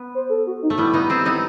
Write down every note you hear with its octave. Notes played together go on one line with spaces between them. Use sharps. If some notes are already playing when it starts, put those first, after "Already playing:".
Already playing: B3
C5
A4
F#4
D#4
A3
G3 B3 E4
B3 D#4
C4 E4
B3 D#4